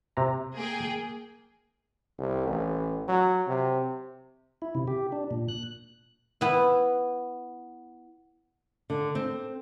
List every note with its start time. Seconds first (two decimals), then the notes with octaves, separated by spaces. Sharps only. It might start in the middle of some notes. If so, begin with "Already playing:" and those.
0.17 C3 A#5
0.57 A#3 G#4 G5
2.19 C2
2.47 A1
3.08 F#3
3.47 C3
4.62 E4
4.75 C3
4.88 G4
5.12 D4
5.31 A#2
5.48 F#6
6.41 B3 E4
8.90 D3
9.15 C4